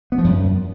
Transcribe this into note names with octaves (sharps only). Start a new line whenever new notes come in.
B3
F3
F#2